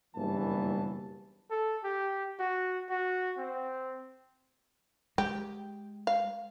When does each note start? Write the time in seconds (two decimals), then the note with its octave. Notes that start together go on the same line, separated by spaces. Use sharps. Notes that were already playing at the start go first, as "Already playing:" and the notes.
0.15 F#1 G2 B2 E3 A#3 A5
1.51 A4
1.84 G4
2.39 F#4
2.90 F#4
3.38 C4
5.18 G#3 G4
6.07 F5